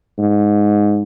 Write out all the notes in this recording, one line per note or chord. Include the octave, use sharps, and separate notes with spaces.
G#2